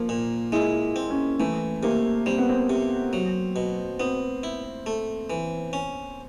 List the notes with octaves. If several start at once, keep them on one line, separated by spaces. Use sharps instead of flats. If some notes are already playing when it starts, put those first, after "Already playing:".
Already playing: F3 A#3
A#2
G#3 E4
C4
C#4
E3 A3
C3 A#3
G3 C4
B3
C4
C3
F#3
B2
B3 C4
E4
A3
E3
C#4